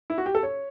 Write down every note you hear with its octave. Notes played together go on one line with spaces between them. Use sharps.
E4
F#4
G4
A4
C#5